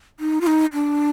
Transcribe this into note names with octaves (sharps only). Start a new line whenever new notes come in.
D#4
F4
D#4
D4